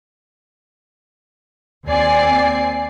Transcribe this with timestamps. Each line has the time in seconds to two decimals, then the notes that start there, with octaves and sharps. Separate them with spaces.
1.87 D#2 C4 D5 G#5 C7